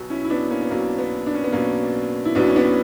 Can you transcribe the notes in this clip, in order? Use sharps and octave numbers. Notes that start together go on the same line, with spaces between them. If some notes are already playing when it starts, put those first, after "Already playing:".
Already playing: B1 B2
C#4 E4
E4
B3 D4
A#3 C#4
B3
B1 B2 A#3
B3
D4
C#4
B3
B1 B2 A#3 C#4
E4
B1 B2 B3 D4
C#4
B3 D4